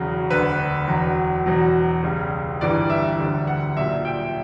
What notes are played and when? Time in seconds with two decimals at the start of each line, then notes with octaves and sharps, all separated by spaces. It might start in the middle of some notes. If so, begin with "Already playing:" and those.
Already playing: E1 E2 C#3 F#3
0.30 E1 D2 D3 B4
0.88 E1 E2 B2 F#3
1.46 E1 E2 B2 F#3
2.03 C#2 C#3 G3
2.61 G1 G2 E3 G3 D5
2.90 E5
3.19 E1 D2 D3 G3
3.47 F#5
3.76 B1 A#2 G3 E5
4.05 G5